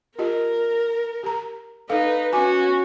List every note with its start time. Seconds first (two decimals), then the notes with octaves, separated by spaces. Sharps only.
0.19 F4 G4 A#4 D#5
1.23 G4 A#5
1.89 D#4 A4 B4 F5
2.32 C#4 F#4 B4 G#5 D6